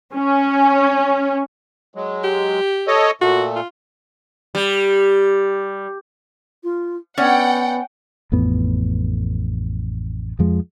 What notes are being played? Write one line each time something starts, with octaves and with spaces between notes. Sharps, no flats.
C#4
F#3 G#3
G4
A4 C#5 D#5
A#2 A3 F#4
F4
G3
F4
B3 C#4 C#5 D5 F#5 G5
A1 F2 A2 B3
F2 F3 G#3